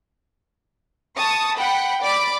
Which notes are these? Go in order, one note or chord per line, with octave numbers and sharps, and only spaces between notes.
A5 C#6 D#6
F#5 G5 B5
D5 B5 D6